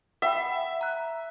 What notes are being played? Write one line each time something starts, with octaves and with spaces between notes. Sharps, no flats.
E5 F#5 G5 B5
A#5 F#6